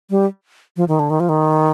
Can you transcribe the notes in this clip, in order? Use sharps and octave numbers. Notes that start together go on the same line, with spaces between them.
G3
F3
D#3
D3
D#3
F3
D#3